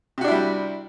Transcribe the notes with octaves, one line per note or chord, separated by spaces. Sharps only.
C3 G3 D4 E4 F#4